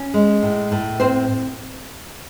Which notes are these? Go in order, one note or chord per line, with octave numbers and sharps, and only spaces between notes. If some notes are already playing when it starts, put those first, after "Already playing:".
Already playing: C#4
G#3
A2
A2
C4 C5